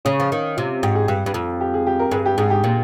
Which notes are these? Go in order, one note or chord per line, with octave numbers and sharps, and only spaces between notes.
C#3 C#4
F3
D#3
C3 F4
G#2 G4
G#4
G2 G4
G2
F2
G4
G#4
G4
A#4
G2 G#4
G4
G#2 G#4
G4
A#2